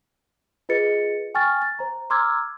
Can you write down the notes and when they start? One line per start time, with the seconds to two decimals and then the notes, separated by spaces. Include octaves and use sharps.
0.69 F4 G#4 B4 D#5 A6 C#7
1.35 G5 G#5 C#6 F6 A6
1.62 A6
1.79 C5 A#5
2.10 A#5 C6 D6 E6 F6 G#6